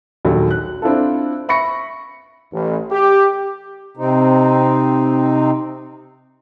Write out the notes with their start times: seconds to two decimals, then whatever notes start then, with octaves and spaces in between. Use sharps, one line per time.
0.25 A#1 D#2 F#3 A3
0.51 F#6
0.82 C4 D4 E4 F4 A4
1.49 E5 B5 C#6 A#6 C#7
2.53 A1
2.91 G4
3.97 C3 C4 D#4